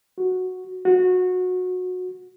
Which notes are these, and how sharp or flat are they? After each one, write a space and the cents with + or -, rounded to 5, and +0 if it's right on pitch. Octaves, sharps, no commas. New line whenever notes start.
F#4 -5
F#4 -20